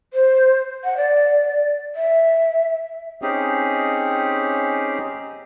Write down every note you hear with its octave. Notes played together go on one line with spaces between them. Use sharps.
C5
F#5
D5
E5
C4 C#4 D#4 G4 G#4